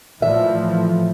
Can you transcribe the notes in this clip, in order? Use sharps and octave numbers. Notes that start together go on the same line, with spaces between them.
A2 E3 F3 E5